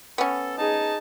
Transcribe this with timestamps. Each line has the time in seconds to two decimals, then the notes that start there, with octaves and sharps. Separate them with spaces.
0.18 B3 C#4 A4
0.58 D#4 G#4 A5